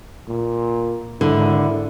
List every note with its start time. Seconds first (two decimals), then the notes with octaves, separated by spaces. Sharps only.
0.29 A#2
1.21 G#1 D3 E4